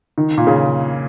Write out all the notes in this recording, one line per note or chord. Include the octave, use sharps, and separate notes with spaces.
D#3
A#2
C#3